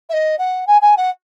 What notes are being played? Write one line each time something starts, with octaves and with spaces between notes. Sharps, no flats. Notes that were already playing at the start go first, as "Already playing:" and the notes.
E5
D#5
F#5
G#5
G#5
F#5